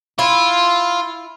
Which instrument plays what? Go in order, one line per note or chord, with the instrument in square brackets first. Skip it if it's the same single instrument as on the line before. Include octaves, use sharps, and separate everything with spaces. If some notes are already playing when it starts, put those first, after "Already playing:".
[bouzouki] E4 [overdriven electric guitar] F4